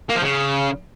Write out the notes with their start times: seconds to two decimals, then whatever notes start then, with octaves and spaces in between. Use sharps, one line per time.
0.09 A#3
0.16 F3
0.22 C#3